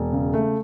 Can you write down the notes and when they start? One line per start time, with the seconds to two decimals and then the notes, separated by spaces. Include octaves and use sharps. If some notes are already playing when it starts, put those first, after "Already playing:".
Already playing: E1
0.13 C#3
0.34 A3